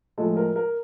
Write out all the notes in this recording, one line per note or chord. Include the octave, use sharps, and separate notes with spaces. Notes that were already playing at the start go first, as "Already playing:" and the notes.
A2 F3 G#3 A4
A#4
A#4